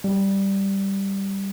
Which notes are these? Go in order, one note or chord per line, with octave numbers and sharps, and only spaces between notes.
G3